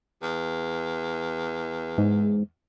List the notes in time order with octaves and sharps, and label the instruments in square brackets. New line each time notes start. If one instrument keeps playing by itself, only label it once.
[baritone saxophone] E2
[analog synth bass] G#2